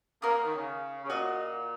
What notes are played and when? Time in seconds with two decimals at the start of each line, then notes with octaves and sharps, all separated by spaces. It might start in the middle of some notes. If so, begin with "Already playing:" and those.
0.22 A#3 A#4 C#5 F#5 D#6
0.33 A#3
0.44 D#3
0.55 C#3
1.04 C#3
1.09 A#2 F#4 D#5 F#5